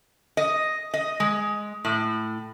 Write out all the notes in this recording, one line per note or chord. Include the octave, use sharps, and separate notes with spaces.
D#5
D#5
G#3
A2